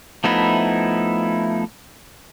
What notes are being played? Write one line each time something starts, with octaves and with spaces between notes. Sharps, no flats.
F3 A3 B3 D#4 E4